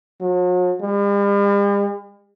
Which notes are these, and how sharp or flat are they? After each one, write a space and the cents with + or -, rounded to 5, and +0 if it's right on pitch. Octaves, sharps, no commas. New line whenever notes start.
F#3 -45
G3 +45